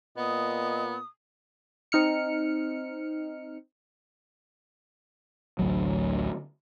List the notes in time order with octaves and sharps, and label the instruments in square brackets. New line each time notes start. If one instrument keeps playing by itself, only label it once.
[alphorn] A#2 [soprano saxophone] B3 [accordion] D#5 [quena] D#6
[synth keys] C4 D#4 F6 C#7
[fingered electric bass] A1 D2 F#3